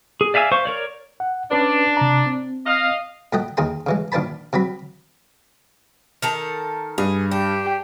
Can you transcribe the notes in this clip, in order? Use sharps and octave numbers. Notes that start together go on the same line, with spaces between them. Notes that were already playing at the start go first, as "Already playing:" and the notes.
G#4
D5 E5 F5 G#5 E6
C5 F5 C#6
A#4 C#5 D5
F#5
C#4 D4 B4
C3 A#5
C4
D#5 F5
A#2 A3 D#5 F#5 G5
D#2 D#4 G#4 G5 C6
C#3 E3 G#3
A#1 D#3 D4 C5 A5 B5
C3 F#3 C4 B5
D#3 A4 A#4
G2 G#4
D4 G4